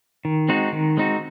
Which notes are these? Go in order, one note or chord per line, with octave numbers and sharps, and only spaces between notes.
D#3
G#3 C4 D#4 F#4
D#3
G#3 C4 D#4 F#4